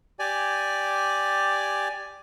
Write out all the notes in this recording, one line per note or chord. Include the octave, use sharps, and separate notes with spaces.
G4 D5 G#5